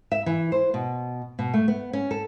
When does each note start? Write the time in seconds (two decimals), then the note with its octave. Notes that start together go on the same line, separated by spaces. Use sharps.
0.12 E5
0.26 E3
0.52 C5
0.74 B2
1.39 B2
1.54 A3
1.68 B3
1.93 C#4
2.11 A4